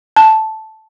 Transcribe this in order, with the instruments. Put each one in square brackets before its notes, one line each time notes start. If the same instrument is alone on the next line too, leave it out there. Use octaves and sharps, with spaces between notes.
[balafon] A5